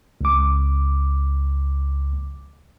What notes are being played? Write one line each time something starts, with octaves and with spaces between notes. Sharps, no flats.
C#2 D6